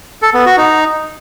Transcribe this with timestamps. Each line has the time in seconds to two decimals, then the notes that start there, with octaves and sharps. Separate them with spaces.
0.22 A4
0.34 B3
0.46 F#4
0.58 D#4